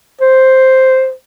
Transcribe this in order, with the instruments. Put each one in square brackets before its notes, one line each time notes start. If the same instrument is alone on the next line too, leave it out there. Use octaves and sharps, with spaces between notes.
[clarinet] C5